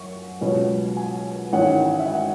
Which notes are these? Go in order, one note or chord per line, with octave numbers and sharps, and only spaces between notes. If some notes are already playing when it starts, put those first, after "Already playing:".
Already playing: F#2 C#6
C#2 B2 F#3 C#4
G#5
G#1 G#2 E3 C#4 F#5
E5
F#5